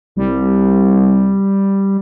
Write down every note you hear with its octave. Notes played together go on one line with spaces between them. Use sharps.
C2 G3